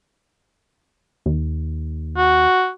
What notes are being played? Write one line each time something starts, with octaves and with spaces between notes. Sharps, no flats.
D#2
F#4